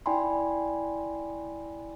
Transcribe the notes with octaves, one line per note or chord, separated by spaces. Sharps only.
E4 D5 G5 G#5 B5 C6